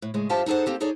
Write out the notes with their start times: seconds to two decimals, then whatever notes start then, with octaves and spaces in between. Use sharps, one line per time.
0.02 A2
0.14 A2 C#3 G#3
0.29 G2 F4 G4 C5 E5 A5
0.46 D#4 G#4 A4 C5 F#5
0.66 A#3 C4 G4 A4
0.80 D#4 G#4 A4 C#5 D5